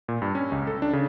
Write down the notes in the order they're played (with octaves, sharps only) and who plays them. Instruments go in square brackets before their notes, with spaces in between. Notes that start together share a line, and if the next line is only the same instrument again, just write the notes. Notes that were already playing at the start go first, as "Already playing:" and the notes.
[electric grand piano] A#2
G2
C#4
C#2
A4
D4
C#3